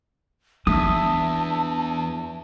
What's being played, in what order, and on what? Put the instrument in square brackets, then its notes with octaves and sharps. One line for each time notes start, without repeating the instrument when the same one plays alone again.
[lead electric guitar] E2 [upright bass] D4 [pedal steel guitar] E5 D#6 [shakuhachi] A5